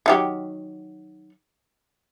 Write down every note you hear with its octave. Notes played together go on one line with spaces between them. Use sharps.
D#3 F#3 G4